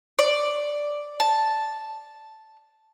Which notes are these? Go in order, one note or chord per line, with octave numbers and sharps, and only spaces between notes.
D5
A5